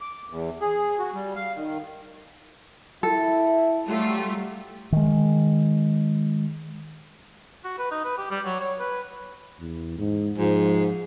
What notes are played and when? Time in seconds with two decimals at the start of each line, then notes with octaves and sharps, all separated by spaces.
0.01 D6
0.30 E2
0.61 G#4
0.99 F#4
1.14 G3
1.35 F5
1.55 D#3
3.03 E4 A4
3.87 F#3 G3 A3 F4 G4
4.92 D#3 G#3
7.64 F#4
7.79 B4
7.91 D#4
8.05 B4
8.18 G4
8.30 G3
8.46 F#3
8.60 C#5
8.80 B4
9.60 E2
9.98 G#2
10.38 G#2 F3